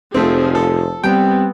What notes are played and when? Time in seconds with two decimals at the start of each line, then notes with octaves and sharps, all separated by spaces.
0.14 F1 F3 A3 C4 G#4
0.55 A4
1.04 G3 B3 C4 G5